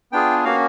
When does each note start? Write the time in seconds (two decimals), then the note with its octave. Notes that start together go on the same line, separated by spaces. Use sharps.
0.12 B3 D4 F4 G#4 G5
0.44 A#3 C#4 F#4 F5